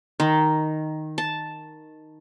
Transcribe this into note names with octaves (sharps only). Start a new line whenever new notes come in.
D#3
A5